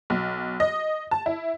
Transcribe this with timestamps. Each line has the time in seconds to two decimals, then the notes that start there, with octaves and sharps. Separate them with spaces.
0.10 B1
0.60 D#5
1.11 A5
1.26 E4